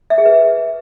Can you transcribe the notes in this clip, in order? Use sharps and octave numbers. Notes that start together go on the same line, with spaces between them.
E5
G#4
B4